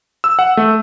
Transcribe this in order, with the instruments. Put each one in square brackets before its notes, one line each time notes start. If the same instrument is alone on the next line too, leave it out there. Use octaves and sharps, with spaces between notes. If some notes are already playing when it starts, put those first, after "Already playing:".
[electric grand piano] E6
F#5
A3